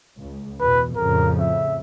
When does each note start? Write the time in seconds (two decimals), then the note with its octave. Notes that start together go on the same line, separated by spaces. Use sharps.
0.19 C#2
0.60 E2 B2 B4
0.96 F2 A2 C#3 A#4
1.40 E5